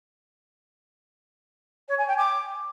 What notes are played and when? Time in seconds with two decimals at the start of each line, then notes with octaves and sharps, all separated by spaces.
1.88 C#5
1.98 G#5
2.08 G5
2.17 D6